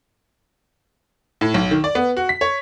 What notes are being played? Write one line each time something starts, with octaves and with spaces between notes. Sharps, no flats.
A2
B1
D#3
D5
B3
F#4
B6
C#5